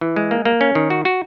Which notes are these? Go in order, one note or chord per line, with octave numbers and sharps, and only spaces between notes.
E3
G#3
A#3
A#3
C#4
D#3
F#4
F#4